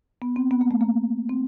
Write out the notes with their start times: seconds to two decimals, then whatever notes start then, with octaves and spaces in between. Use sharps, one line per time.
0.22 B3
0.36 C4
0.51 B3
0.61 A#3
0.71 A3
0.81 A#3
1.29 C4